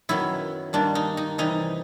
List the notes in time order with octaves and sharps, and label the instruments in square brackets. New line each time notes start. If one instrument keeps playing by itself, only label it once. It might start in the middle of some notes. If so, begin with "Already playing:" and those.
[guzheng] F#2 D#3 F#3 B3 E4
G2 D#3 G3 A#3 D4
D#4
D#4
C3 E3 G3 D#4